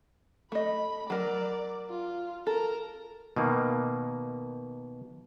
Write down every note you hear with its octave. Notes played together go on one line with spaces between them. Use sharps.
A3 D#5 B5
F#3 A#4 D5
F4
A4 A#4 A#5
B2 D#3 A#3